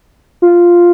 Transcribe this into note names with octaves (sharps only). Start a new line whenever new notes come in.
F4